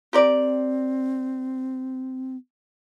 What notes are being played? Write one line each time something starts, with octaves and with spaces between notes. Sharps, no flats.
C4 G4 A#4 D5